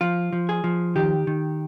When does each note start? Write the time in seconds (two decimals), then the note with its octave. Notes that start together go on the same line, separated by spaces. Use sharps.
0.01 F3 F4
0.33 F3
0.49 G#4
0.64 F3
0.96 D#3 G4
1.27 D#3